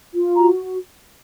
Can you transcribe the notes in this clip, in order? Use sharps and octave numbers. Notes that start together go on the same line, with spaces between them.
F4
F#4 A#5